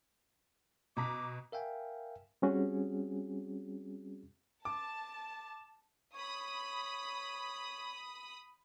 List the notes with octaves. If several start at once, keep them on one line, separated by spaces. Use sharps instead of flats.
B2 A#5 D6 B6
A#4 E5 F5 G5 G#5
G3 C4 C#4 F#4 G#4
A5 D6
C#5 B5 D#6